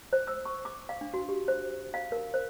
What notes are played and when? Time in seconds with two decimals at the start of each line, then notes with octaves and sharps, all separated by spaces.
0.13 C5
0.27 E6
0.45 C#6
0.65 D6
0.89 F5
1.01 D4
1.14 F#4
1.29 G4
1.48 C5
1.94 F5
2.12 A#4
2.34 C5